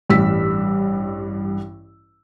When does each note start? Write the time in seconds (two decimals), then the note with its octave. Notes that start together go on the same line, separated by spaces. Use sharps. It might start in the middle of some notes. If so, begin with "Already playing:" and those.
0.10 A1 G2 E6 B6